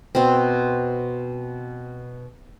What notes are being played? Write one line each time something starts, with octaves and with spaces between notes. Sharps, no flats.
B2 C4